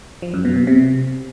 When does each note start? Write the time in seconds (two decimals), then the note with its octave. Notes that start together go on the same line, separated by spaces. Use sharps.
0.22 F3
0.34 F#2
0.45 B2
0.56 B2
0.67 C3